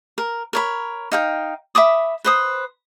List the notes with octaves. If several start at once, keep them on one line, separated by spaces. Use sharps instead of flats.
A#4
A#4 C#5 B5
D#4 F5 G5
E5 B5 D6 D#6
B4 C5 D#6